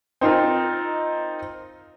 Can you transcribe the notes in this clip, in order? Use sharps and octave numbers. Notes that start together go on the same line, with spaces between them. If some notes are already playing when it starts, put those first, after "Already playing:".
C4 D#4 F4 A#4